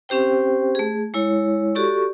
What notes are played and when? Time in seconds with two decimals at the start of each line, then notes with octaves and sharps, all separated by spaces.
0.09 C4 C#4 G4 C5 G5
0.75 A3 G#4
1.14 G#3 E4 C#5
1.75 F#4 G4 A4 D5 C#6